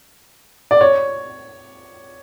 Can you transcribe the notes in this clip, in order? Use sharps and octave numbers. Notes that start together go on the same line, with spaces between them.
D5
C#5